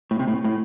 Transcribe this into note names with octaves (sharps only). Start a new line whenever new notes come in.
A2
C3
A2
A2